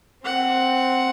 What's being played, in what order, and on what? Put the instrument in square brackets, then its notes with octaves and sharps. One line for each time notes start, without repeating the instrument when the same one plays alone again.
[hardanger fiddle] C4 [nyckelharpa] F#5